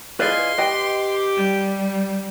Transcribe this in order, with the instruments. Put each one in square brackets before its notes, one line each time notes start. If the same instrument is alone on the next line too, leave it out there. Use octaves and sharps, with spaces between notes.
[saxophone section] E4 F4 G#4 [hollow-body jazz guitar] B4 D5 D#5 [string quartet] C6
[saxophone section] G4 [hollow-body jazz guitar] B4 D#5 G5
[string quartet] G3